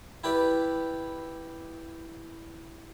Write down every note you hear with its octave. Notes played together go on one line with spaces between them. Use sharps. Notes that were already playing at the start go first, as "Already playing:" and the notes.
E4 G4 B4 D5